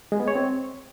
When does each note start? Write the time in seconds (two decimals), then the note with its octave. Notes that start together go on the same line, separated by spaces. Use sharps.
0.12 G#3
0.20 B3
0.28 C#5
0.35 C4